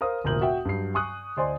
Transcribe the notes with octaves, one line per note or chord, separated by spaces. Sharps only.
A#4 C5 F5 D#6
F1 D2 A#2 A#4 G6 F#7
F#4 E5 G5
G2 F#3 C7
G#5 C#6 D#6 F#6
D2 C5 D5 D#5 G#5 C6